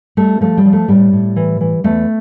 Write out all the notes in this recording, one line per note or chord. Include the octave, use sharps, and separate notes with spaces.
G3 A3
F3 A3
G3
F3
A3
A2 G3
A2
E3
E3
E2 A3